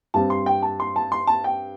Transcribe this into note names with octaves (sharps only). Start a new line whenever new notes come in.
G2 G3 C4 A5
C6
G5
A5
C6
A5
C6
A5
G5